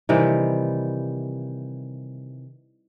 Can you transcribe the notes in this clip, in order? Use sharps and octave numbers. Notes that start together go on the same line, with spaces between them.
C3 D#3 E3 G3